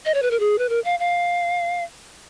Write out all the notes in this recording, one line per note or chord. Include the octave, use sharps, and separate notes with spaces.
D#5
C#5
B4
A#4
G#4
B4
A#4
F5
F5